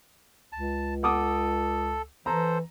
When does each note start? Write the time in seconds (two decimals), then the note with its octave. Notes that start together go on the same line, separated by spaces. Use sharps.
0.52 C#2 A5
1.03 A4 F#5 D6 D#6
2.26 E3 A4 C5 A#5